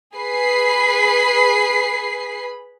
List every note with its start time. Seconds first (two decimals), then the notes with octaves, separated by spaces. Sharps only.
0.16 G#4 B4 B5 C7